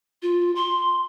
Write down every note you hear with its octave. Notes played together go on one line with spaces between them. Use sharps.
F4
C6